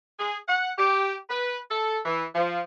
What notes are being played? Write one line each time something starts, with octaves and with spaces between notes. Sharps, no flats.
G#4
F#5
G4
B4
A4
E3
F3